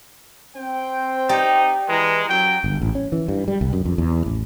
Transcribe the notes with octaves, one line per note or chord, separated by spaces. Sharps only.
C4 C5 G5
D#4 G4 D5
E3 G#3 B4 A#5
F#2 F#3 G5
G1
A1
C#4
E3
G2
G3
C2
F#2
F2
E2
A1